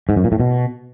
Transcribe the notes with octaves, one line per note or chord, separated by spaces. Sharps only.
G#2
F#2
A#2
A2
B2